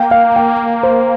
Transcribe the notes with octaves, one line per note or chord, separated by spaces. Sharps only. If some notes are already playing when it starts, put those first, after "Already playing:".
Already playing: A#3 G5
F5
G5
C5